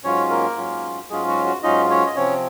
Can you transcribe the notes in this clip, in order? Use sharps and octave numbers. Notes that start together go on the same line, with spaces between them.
G#2 F#3 C#4 F4 C#5
A#3 A#4
G#2 F#3 C#4 F4
G#2 F#3 G#3 C#4 F4 G#4
F#4
F#4
G#2 F#3 C#4 D#4 F4 D#5
C#4 C#5
D#5
C3 F3 C4 C#4 C#5